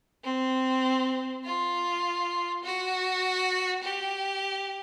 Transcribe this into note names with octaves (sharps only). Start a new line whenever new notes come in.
C4
F4
F#4
G4